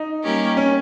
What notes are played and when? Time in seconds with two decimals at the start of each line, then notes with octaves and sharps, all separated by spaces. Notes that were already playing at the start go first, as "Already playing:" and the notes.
Already playing: D#4
0.23 G3 A#3 C#4 G4 A#4
0.57 C#4